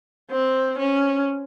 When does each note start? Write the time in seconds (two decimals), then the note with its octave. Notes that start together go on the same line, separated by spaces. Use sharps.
0.31 C4
0.78 C#4